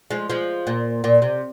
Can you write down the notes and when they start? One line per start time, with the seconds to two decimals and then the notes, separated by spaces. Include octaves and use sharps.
0.10 F3 G#3
0.30 F3 G#3
0.67 A#2
1.04 A#2
1.22 C3